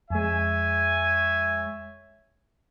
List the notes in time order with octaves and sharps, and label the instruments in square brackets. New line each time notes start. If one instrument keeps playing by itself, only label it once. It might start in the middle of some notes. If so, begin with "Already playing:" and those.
[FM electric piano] F2 G#3 [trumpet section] C#5 E5 G#5